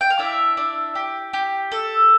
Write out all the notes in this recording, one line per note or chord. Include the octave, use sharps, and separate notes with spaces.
G5
F5
D4 E4 E5
D4
G4
G4
A4